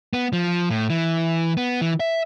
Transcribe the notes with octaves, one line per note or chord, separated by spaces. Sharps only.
B3
F3
A2
E3
B3
E3
E5